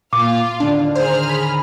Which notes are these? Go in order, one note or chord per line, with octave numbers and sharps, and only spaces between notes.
A#2 F4 F5 D6
D#2 A2 D3 D4
G#4 C5 A#5 F6
B5